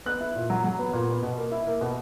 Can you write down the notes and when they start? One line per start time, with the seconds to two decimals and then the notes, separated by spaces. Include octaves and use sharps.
0.06 B3 F#6
0.20 E4
0.36 A#2
0.50 F#3
0.64 F#3
0.79 B3
0.93 A#2
1.08 B3
1.23 B2
1.37 A#3
1.52 E4
1.67 A#3
1.81 B2